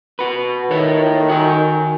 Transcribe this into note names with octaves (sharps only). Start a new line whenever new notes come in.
F#4 B4
D#3 A4 C#5 E5
F#4 G#5